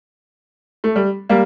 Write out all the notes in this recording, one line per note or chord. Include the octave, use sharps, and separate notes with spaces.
A3
G3
G3 A#3